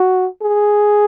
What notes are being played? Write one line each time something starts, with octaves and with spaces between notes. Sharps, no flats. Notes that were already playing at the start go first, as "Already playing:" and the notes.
Already playing: F#4
G#4